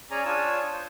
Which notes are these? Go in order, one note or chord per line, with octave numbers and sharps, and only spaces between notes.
C#4 G#4 C#5 D5 G#5 A#5
D4 F4 C#5 G#5 D#6 E6
C5